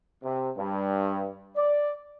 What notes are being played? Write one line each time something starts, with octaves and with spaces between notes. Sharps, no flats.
C3
G2
D5